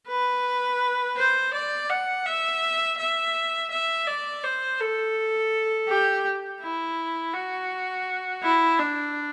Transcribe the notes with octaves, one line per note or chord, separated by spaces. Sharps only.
B4
C5
D5
F#5
E5
E5
E5
D5
C5
A4
G4
E4
F#4
E4
D4